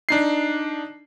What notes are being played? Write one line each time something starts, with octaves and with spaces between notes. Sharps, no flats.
D4 D#4 C7